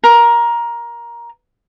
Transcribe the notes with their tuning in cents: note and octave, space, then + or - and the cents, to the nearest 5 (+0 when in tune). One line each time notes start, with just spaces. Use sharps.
A#4 +15